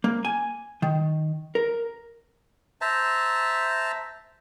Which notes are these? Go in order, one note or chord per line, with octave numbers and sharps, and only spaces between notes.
A#3
G#5
D#3
A#4
C5 E5 A5 A#5